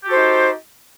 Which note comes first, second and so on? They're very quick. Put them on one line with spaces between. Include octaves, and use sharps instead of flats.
G4 F#4 A4 C5 D#4